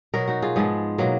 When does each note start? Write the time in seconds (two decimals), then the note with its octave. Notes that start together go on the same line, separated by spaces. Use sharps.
0.14 B2 F#3 F#4 A#4
0.28 D#4 F#4
0.42 F4 G#4
0.56 G#2 F3 G#3 B3
0.98 B2 F#3 A#3